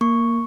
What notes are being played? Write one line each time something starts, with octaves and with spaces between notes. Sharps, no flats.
A#3 C#6